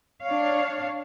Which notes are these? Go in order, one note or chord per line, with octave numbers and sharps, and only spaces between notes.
D4 C#5 F5